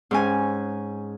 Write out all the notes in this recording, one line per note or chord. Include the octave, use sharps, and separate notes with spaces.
G#2 C#4 G#5